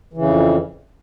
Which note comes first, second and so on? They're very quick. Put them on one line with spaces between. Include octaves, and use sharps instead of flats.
E3 C#3 F2